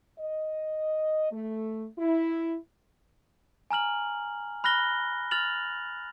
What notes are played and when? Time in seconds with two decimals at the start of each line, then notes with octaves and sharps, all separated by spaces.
0.19 D#5
1.32 A3
1.99 E4
3.71 G#5 A#5 F6 F#7
4.64 B5 F6 F#6 A#6 G7
5.31 F6 A6 F7 F#7